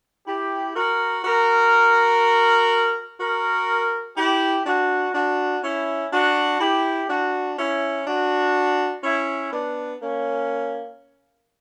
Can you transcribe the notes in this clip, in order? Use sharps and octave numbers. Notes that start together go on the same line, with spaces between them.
E4 G4
F#4 A#4
F#4 A#4
F#4 A#4
E4 G4
D4 F#4
D4 F#4
C#4 E4
D4 F#4
E4 G4
D4 F#4
C#4 E4
D4 F#4
C#4 E4
B3 D4
A#3 C#4